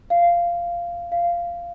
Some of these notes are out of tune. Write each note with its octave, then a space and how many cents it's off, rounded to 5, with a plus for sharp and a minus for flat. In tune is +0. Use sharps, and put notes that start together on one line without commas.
F5 -10
F5 -10